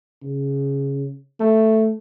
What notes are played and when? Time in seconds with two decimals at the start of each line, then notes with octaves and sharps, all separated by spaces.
0.23 C#3
1.40 A3